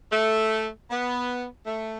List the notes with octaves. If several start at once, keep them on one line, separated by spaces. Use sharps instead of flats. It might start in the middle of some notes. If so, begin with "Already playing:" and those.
A3
B3
A3